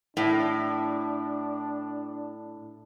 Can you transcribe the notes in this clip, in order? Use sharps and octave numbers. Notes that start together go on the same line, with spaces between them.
A2 D4